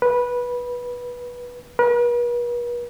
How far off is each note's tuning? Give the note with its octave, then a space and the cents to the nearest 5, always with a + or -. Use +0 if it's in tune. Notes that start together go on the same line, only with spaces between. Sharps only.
B4 -15
B4 -45